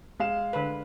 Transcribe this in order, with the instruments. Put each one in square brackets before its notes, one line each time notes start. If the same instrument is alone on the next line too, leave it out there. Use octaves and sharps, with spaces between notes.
[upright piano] G#3 F5 E7
[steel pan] D3 B4